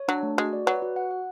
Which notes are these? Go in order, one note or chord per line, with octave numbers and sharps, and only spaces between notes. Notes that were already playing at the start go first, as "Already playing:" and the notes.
Already playing: C#5
F#3 D4
A3
G#3 F#4
D5
F#3 B4
F#4
F#5
F#5